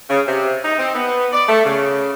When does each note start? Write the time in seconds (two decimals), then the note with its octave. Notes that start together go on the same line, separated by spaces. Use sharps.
0.09 C#3
0.27 C3
0.65 D#4
0.79 C4
0.95 B3
1.33 D5
1.49 A3
1.66 C#3